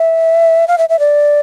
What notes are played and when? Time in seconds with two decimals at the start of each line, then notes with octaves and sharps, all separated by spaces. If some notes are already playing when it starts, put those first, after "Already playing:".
Already playing: E5
0.68 F5
0.78 E5
0.89 E5
0.99 D5